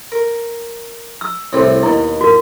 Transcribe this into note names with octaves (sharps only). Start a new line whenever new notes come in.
A#4
E6
C2 A2 C4
D#2 B2 E4
F#4 A#4